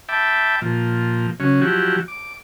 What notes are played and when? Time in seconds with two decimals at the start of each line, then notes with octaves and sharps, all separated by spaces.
0.09 E5 G5 A5 B5 D6
0.62 A#2 F3
1.40 C#3 F#3 C#4
1.61 F3 F#3 E4 F#4 G4
2.08 D6